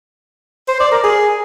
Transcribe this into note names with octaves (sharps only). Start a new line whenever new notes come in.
C5
D5
A#4
G#4